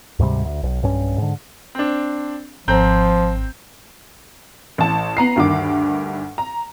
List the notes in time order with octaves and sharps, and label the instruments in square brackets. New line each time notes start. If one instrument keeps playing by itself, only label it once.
[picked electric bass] D2 G#2 C3 G3
D2
B1
B1 G2 C#4
G#2 D3
[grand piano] C4 D4
[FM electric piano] G#1 [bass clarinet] F3 [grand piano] C4 A#5 G6
[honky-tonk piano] A1 A5
B3 A#5 C7
D2 G2 D#3 D6
A#5